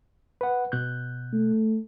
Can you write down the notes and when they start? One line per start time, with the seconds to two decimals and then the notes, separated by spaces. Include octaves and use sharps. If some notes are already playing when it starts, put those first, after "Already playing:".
0.41 B4 F#5
0.72 B2 F#6 G6
1.33 A3